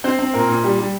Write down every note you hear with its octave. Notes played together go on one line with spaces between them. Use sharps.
C4 C5
C4
A#2 A#4
A#2
G3 G4
G3